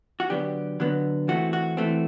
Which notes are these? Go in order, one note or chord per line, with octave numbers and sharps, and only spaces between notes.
F#4
D3 F#3 B3 G4
D3 F#3 B3
E3 A3 C4 F#4
F#4
E3 A3 C4